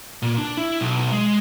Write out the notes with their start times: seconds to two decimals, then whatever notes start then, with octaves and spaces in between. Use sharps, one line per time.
0.22 A#2
0.38 D4
0.57 E4
0.81 B1
1.12 G#3